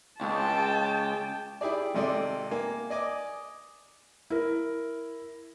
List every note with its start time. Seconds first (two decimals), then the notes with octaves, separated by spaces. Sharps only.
0.21 C#2 G5 A5
1.61 E4 G4 G#4 D5
1.94 G#1 C3 A4 D5
2.51 A#3 G#5
2.90 D5 D#5 G#5 D6
4.30 E4 A#4